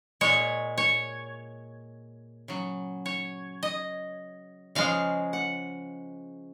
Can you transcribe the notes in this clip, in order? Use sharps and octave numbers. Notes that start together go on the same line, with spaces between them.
A#2 G#3 C#5
C#5
C#3 F#3
C#5
D#5
C#3 F3 G#3 F5
F#5